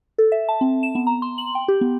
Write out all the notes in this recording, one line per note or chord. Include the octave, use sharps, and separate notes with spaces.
A4
E5
A5
C4
E7
B3
A#5
C6
F#7
G5
G4
B3